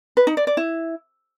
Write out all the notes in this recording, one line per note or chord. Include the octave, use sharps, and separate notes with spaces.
B4
D#4
D5
D5
E4